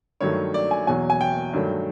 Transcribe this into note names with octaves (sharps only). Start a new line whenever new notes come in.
G2 D#3 F#3 A3 C#5
D5
G#5
E2 B2 F#3 G#5
G#5
G5
G2 D#3 F#3 A3